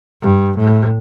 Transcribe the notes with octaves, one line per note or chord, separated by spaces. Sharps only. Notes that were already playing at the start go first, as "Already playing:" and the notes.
G2
A2